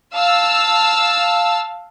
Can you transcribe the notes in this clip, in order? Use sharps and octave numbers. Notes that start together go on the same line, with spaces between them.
F5 A5 E6